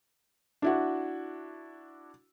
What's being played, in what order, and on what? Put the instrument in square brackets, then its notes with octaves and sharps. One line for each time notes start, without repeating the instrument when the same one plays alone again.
[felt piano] D4 E4 F#4